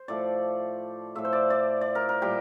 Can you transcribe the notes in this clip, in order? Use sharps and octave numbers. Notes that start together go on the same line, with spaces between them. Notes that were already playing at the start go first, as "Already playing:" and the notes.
Already playing: C5
A2 F3 A3 D5
A2 F3 A3 E5
C5
D5
D5
D5
A#4
A#4
A#2 G3 G4